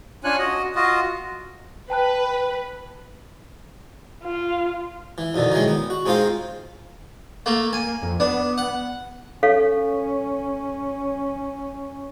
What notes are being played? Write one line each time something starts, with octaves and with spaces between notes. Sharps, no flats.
C#4 D4 F4 C#5 G#5 F#6
F#4 D#5
F4 F#4 D#5
B4 G5 A5 F#6
F4
E3
F2 B2 D3 D#3
D#3 E3 F#3 G#3
B3
F#4
G#3 C4 D#4 F4 C5 F5
A3 A#3
A#3 G#5
F2
B3 D4
F#5
C#4 A4 C#5 F5